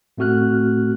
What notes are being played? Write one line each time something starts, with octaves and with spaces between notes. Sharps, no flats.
A2 A3 C4 F#4 F6 F#6